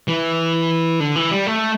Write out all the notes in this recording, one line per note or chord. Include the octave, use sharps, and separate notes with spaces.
E3
D3
E3
G3
A3